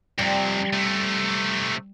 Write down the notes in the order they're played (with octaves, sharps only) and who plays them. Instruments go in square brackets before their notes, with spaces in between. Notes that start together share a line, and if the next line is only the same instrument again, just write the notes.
[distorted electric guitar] F2 C3 [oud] G3
[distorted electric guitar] C3 A3